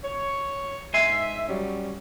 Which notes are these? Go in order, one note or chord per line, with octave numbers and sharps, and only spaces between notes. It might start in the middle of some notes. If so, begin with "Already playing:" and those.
C#5
G#2 E5 G#5 C6
F#3 G3 C#4